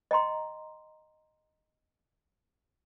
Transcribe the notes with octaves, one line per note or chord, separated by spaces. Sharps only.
D#5 G5 A#5 C6